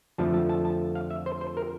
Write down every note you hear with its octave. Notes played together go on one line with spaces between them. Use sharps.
F2 D3 F3 A3 A5
A5
A5
A5
F5
E5
C5
C5
A#4